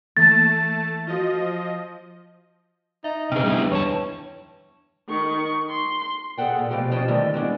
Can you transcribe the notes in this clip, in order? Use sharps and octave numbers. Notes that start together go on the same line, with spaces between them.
E3 A3 A#3 A5 A6
F3 F4 F#4 D#5 F6
D#4 E5
C3 D4 G#4 B4
G3 B3 E4
E2 C#5 A5
D#3 C#6
C6
G#4 A4 C#5 E5 F#5 G5
A#2
B2 F3 A3 G4 F5
B2 F3 C#4 G4 D#5 A5
A2 D3 D#3 G3 A3
G#3 B3 C#4 D4